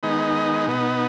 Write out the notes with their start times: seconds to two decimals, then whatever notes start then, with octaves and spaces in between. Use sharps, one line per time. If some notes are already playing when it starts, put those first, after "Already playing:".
0.03 D#3 G#3 B3 D#4
0.67 B2 B3 D#4